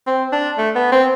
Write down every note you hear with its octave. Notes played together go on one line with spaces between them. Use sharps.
C4
D4
A3
B3
C4